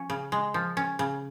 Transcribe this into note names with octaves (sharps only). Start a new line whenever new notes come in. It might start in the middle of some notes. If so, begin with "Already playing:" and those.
Already playing: F3 C#4
C#3
G#3
F3
C#4
C#3